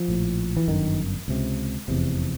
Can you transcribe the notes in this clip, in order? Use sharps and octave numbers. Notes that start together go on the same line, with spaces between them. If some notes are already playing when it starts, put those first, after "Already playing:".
Already playing: F3
A#1 A2
E3
G1 F#2 D3 D#3
C#2 C3
F1 E2 C3